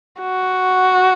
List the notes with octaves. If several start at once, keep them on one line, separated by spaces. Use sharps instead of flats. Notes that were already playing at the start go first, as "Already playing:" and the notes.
F#4